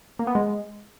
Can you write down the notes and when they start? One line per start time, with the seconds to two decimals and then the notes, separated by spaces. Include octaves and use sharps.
0.19 A#3
0.27 B3
0.35 G#3